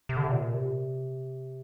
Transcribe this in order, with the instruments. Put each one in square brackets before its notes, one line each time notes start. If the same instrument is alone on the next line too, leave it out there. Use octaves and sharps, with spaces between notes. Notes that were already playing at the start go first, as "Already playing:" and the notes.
[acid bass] C3
D3
C3
A#2
C3